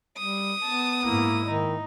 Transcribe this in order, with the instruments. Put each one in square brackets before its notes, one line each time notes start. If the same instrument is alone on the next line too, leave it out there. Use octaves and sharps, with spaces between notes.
[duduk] G3 [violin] D#6
[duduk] B3 [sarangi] A5
[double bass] G#2 E4 [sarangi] A#3
[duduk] D#3 [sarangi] D#4